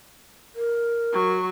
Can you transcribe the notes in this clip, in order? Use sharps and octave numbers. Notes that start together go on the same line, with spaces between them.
A#4
F#3 C#6